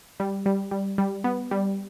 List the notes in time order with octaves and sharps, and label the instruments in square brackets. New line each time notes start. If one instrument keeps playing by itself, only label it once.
[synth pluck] G3
G3
G3
G3
B3
G3